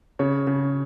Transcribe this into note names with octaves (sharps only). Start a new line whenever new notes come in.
C#3 C#5
C#3